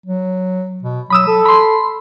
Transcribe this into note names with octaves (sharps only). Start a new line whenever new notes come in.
F#3
B2
F#3 B5 D#6 E6
A4
B5 C6